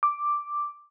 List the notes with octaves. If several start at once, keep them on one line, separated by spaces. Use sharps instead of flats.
D6